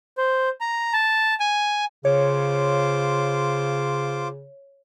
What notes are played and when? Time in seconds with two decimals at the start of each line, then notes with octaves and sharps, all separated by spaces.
0.18 C5
0.61 A#5
0.93 A5
1.40 G#5
2.05 C#3 F4 C5 C#5 D6